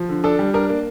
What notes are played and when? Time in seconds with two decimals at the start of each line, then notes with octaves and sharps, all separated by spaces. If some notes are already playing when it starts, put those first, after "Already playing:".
Already playing: F3
0.09 D3
0.24 D4 A4
0.39 G3
0.54 D4 A#4
0.69 A#3